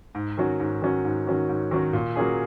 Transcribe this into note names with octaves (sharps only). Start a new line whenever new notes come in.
G#2
D#3 F#3 C#4 F#4
G#2
D#3 F#3 C#4 F#4
G#2
D#3 F#3 C#4 F#4
G#2
D#3 F#3 C#4 F#4
A#2
F#3 A#3 C#4 G#4